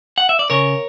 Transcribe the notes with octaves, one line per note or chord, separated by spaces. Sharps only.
F#5
E5
D5
C#3 A#4 C#5